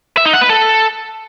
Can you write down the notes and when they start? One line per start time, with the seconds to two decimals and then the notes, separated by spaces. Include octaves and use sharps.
0.17 E5
0.25 D#4
0.33 F#5
0.41 B4
0.49 A4